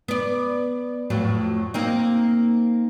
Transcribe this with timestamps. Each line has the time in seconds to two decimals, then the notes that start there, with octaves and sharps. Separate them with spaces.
0.08 B3 D5
1.10 F2 A2 F#3
1.74 A#3 C4 D#4